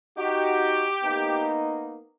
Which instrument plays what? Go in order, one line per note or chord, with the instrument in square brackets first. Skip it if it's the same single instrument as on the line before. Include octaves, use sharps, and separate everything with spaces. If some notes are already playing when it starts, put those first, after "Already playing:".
[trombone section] D#4 F#4 [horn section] G4
[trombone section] A#3 B3 D#4